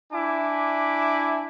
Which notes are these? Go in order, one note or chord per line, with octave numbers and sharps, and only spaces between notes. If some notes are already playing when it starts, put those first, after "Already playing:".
D4 E4 G#5 D6